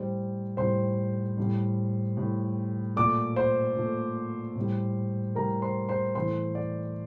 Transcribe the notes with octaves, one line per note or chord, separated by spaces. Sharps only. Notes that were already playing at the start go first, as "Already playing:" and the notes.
Already playing: A2 G3 C5
A2 G3 C5 C6
A2 G3
A2 G3
A#2 A3 D5 D6
C5 C6
A#2 A3
A2 G3
A2 G3 A#4 A#5
C5 C6
C5 C6
A2 E3 A3 C5 C6
D5